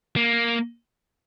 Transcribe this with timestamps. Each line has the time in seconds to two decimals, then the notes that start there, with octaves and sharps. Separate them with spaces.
0.16 A#3